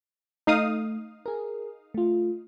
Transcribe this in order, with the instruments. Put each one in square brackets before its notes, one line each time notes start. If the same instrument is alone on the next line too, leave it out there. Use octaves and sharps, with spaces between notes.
[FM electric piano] A3 [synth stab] D#4 F5 D#6
[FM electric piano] G#4 A#4
A3 F4